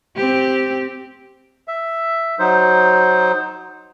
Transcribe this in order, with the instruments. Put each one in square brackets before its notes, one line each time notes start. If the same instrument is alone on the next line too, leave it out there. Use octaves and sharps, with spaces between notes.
[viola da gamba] C4 G4
[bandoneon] E5
F#3 D#4 C5